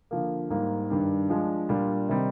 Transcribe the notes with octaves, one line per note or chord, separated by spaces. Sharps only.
D3 F3 A#3
G#2 G3 A#3
G2 D#3 G3 D4
F3 G#3 D4
A#2 G3 D4 F4
C3 D#3 G3 C4 D#4